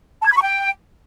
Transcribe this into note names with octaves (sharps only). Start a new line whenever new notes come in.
A5
G#6
B5
C#6
G5